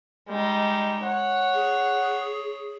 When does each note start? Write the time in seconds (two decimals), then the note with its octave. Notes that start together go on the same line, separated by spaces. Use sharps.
0.29 G3 G#3 D#4
1.03 C#5 F#5
1.54 G#4